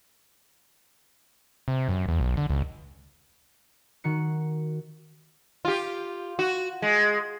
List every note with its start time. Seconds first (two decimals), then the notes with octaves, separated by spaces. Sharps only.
1.68 C3
1.89 F#2
2.08 E2
2.20 B1
2.37 D3
2.50 C#2
4.04 D#3 F#4 C#7
5.65 F4 G4
6.39 F#4
6.82 G#3